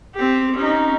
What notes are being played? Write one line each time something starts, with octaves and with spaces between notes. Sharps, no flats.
C4 G4
C#4 D#4